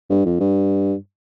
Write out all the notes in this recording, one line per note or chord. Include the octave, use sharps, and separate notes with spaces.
G2
F2
G2